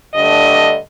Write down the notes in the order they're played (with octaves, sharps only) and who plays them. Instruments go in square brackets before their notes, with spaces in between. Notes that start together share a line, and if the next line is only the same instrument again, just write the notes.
[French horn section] G2 D3 A3 D#5